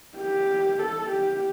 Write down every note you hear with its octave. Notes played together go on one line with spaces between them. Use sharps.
G4
A4
G4